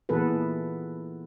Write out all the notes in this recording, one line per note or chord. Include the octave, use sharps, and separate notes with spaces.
A#2 E3 B3 G#4 A4 B4